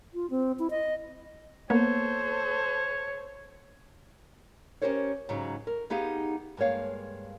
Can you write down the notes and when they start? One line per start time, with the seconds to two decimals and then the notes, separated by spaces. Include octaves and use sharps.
0.14 F4
0.30 C4
0.59 E4
0.70 D#5
1.70 A#3 B3 A4 C5 C#5
4.82 C#4 D#4 G4 A#4 C5 C#5
5.29 G#2 C#3 F#3 G#3
5.67 A#4
5.90 B3 D#4 G4 G#4 F5
6.57 G2 G#3 A#3 C#5 F5